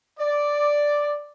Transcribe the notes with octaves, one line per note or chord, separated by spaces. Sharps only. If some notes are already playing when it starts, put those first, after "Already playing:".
D5